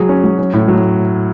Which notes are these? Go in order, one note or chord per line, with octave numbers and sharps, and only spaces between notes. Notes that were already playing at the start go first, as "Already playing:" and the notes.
Already playing: F#3 G#4
C#4
F#3
C#4
A2
F#3